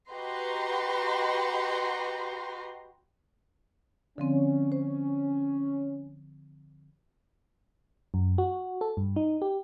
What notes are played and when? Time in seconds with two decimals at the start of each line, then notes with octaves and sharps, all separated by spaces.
0.13 F#4 G4 B4 D#5 A#5 C6
4.18 D3 F3 C4 C#4
4.72 C5
8.14 F#2
8.38 F#4
8.81 A4
8.97 G2
9.16 D#4
9.42 G4